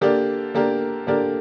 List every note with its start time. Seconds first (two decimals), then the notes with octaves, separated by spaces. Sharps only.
0.01 D3 A#3 G4 A#4 D5
0.54 D3 A#3 G4 A#4 D5
1.07 D3 A#3 G4 A#4 D5